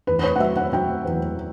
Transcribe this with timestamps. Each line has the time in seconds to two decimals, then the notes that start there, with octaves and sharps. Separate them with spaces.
0.07 E2 B4
0.19 B4
0.23 C#5
0.36 F#5
0.40 F#3 E5
0.57 F#5
0.73 F#3 G5
1.05 E2